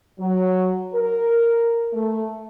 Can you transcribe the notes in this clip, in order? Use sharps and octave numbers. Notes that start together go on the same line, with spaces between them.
F#3
A#4
A3